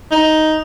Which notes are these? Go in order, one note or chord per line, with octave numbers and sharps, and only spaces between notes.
D#4